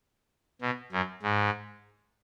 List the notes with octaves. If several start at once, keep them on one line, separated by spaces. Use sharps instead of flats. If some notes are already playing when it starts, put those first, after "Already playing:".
B2
F#2
G#2